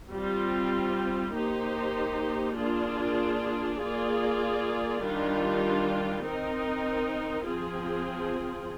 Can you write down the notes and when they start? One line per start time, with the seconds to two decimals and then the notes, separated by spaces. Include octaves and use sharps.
0.11 G3 C4 F4
1.33 A#3 D#4 G4 C5
2.56 A#3 D4 F4 G#4
3.79 A#3 F4 G#4 D5
5.01 D#3 G3 D4 F4
6.24 C4 D#4 A#4
7.47 F3 C4 F4 G#4